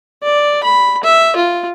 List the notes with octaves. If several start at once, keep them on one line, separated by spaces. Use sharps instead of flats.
D5
B5
E5
F4